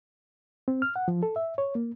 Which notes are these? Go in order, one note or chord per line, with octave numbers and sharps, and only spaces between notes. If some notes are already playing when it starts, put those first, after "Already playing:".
C4
F6
F#5
F3
A4
E5
C#5
A#3